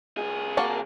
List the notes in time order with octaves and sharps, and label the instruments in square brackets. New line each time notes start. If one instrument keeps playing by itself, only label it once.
[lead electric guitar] C2 G#4
[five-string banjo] A#3 F#4 A5